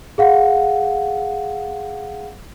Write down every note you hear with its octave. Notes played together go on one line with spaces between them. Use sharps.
G#4 F5 F#5